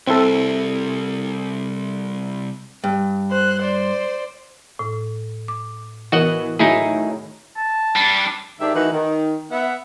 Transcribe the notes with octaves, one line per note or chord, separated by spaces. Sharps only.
C2 C4 E4 A4
G2
C5 F#6
C5 D5
A2
D6
E3 B3 F#4 A#4 D#5 F#5
A2 D#3 F#3 D#4 E4 G#4
A5
G3 D4
G#2 D#3 D4 G4 E5
D#3 E3 A3 D#4 F#4 B4
D#3
B3 E5 F#5